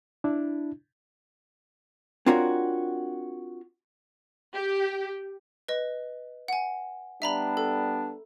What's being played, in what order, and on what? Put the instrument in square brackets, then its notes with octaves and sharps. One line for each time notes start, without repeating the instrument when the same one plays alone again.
[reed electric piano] D4 E4
[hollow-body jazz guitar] C4 D4 F4 F#4 A#4 C#5
[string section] G4
[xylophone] B4 D#5
F#5 G#5
[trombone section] G3 B3 D4 [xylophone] E5 A#5 B5
[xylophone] A4